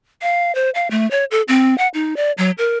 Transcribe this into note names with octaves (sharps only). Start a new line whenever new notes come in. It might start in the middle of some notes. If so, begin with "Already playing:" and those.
F5
C5
F5
A3
C#5
A4
C4
F#5
D#4
D5
F#3
A#4